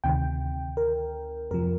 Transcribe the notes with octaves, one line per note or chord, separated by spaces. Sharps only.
D2 C3 D#3 G5
A#4
F2 C3 F3 A#4